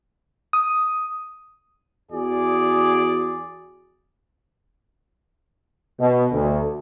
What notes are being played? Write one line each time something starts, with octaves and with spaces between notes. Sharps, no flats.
D#6
E2 F#4 G#4 D5
B2
D2